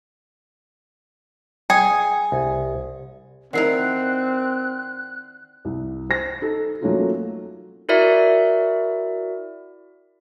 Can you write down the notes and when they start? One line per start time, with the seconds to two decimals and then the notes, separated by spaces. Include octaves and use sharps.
1.70 G#4 G5
2.32 C2
3.53 D#3 C4 E4 A#4 D5 F#5 F#6 C7
5.65 C2
6.09 C5 A#6
6.41 D#4 A4
6.81 F#3 A3 A#3 C#4 D#4 F4
7.89 E4 F#4 A#4 D5 E5